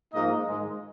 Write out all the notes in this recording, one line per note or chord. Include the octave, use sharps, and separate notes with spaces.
G#2 F3 A#3 D#4 D#5
G#2 D#3 G#3